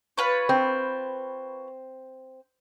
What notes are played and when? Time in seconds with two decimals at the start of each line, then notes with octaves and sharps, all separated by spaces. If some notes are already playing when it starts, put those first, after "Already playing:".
0.18 F4 B4 C#5
0.49 C4